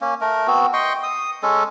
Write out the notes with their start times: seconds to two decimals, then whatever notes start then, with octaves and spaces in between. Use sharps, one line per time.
0.01 A#3 C#4
0.21 A3 A#4
0.47 B3 C4 F#4
0.73 D#5 G5 C6 C#6
1.03 D#6
1.43 G#3 C#4 A4